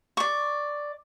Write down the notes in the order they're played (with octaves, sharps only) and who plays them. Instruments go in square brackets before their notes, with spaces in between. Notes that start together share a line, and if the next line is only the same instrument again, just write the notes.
[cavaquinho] D5 C#6